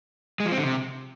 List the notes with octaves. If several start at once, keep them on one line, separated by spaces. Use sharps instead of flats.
G#3
F3
C4
D3
C3